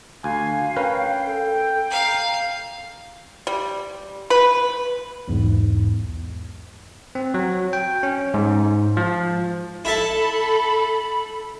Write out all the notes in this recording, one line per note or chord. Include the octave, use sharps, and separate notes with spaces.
D2 F5 G#5
C#4 A#4 B4 G5
A4
F5 A#5
G3
B4
B1 E2 G#2
C4
F#3
G5
C#4
G#2
F3
E4 A4 E5 A5 B5